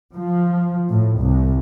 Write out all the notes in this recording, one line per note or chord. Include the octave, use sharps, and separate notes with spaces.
F3
A2
C2